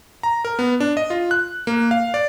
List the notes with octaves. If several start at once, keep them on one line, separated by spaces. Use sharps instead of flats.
A#5
A#4
B3
D4
D#5
F4
F#6
A#3
F5
D5